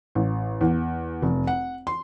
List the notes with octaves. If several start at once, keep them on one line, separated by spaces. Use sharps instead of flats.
A1
E2
F1
F#5
C6